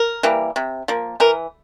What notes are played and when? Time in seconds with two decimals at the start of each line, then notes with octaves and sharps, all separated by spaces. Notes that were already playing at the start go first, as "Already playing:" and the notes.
Already playing: A#4
0.23 E3 G3 A#3
0.56 C3
0.88 F3 A#3
1.20 E3 A#4